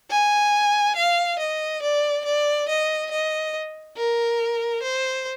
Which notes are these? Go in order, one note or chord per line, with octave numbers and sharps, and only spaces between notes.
G#5
F5
D#5
D5
D5
D#5
D#5
A#4
C5